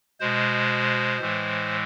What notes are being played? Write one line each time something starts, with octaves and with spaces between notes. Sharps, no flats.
B2 G#3 C5
A2 E3 G#3